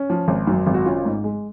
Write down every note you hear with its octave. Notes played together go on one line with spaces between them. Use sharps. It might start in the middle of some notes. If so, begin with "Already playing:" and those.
Already playing: C#4
F3
G#1
F#2
G#1
F#4
C#4 F4
G#2
G#3